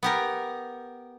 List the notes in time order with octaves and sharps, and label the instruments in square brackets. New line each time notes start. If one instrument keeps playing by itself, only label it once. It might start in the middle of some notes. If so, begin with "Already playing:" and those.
[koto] B3 G4 A#4